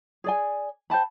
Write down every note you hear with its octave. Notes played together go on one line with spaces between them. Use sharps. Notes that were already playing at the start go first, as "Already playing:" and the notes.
G#4 D5 G#5
C5 G5 A5 B5